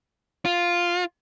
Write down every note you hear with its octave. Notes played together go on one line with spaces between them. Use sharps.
F4